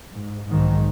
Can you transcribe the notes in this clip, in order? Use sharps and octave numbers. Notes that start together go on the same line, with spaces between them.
G#2
B1 G#2 D#3